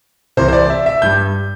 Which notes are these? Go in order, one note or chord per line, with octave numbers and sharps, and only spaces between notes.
C2 C3 E3 C5
C5
D5
E5
E5
G2 G3 G6